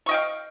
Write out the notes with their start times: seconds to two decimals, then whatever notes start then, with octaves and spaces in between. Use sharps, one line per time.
0.06 C#6
0.09 D#5
0.11 G5
0.14 F5